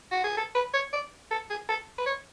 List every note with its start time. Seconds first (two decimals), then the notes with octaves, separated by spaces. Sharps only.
0.11 F#4
0.24 G#4
0.37 A4
0.55 B4
0.74 C#5
0.93 D5
1.31 A4
1.50 G#4
1.69 A4
1.98 B4
2.06 C#5